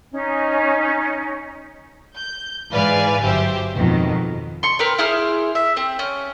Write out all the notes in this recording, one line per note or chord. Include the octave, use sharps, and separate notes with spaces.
C#4 D#4
G6
G#2 E3 B4 D5 F5 G#5
G1 F#3 G4 C5 E5
F2 G#2 B2 D#3
C6 C#6
C4 A#4 B4 F6
E4 G#4 C5 F6
E5
C4
C#4